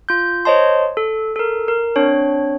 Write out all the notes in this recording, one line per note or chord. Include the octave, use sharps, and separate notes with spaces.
F4 G6
C5 C#5 D#5 A5 C6
A4
A4 A#4
A#4
C4 D4 C#5